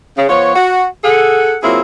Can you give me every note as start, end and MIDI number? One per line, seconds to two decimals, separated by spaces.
0.17 0.27 49
0.29 0.52 53
0.29 0.52 59
0.29 0.52 65
0.29 0.52 73
0.55 0.85 66
1.04 1.55 68
1.04 1.55 69
1.04 1.55 78
1.62 1.81 54
1.62 1.81 58
1.62 1.81 60
1.62 1.81 64
1.62 1.81 65
1.62 1.81 68